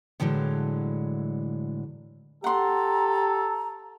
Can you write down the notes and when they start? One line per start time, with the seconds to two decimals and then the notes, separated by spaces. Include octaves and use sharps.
0.20 A2 D3 E3 F#3 G#3
2.44 G4 A4 F#5 A#5 C6